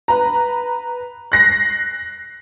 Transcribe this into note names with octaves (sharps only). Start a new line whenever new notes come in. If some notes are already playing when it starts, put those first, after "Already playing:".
B4 A#5
F#6 A#6 C7